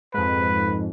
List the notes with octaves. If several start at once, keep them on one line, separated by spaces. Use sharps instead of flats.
F2 G#2 B4